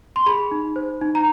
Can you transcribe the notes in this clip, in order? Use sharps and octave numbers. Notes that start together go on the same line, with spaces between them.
C6
G#4 B5
D#4
C5
D#4
A#5